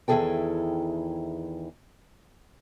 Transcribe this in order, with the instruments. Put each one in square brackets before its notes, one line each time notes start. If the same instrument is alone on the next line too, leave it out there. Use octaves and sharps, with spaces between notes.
[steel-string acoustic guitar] E2 D#3 E4 G#4 A4 G5